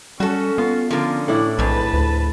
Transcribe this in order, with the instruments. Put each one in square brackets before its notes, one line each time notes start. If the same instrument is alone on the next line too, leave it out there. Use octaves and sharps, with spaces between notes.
[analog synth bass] G3 [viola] C#4 [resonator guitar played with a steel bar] F#4 A4
[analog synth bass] B3 [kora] F4
[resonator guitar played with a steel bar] D3 F3 [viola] C#4 [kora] F4 A#4
[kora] A2 D4 E4
[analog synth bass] B1 [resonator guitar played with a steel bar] F2 G#2 [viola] B4 A5
[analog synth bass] D2